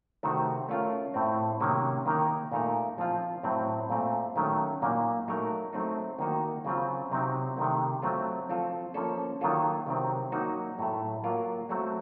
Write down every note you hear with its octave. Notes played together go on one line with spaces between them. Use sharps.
C3 D#3 A3 C4 F#4
A3 C#4 F4 A#4
A2 A3 C4
C3 D#3 F#3 A#3 C#4
D#3 A#3 D#4 A#4
A#2 A3 D#4 A#4
F3 C4 F4
A2 F#3 C4
A#2 A3 C4
D#3 F#3 A3 C#4
A#2 F#3 A#3 D#4
F#3 A3 D#4 A#4
F#3 A3 C4 D#4
D#3 A#3 D#4 F#4
C#3 F#3 C4 F4
C3 F#3 C4 D#4
C3 D#3 A3
F#3 A3 C4 F4
F3 C4 F4 A4
F3 A#3 C#4 A4
D#3 F#3 A#3 F4 A4
C3 D#3 F#3 C4
F#3 A#3 D#4 F#4
A2 F#3 A3
F#3 A#3 F4 A#4
F#3 A3 C4 F#4